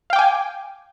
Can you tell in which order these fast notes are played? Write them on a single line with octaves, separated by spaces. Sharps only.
F5 G5 D6 G#5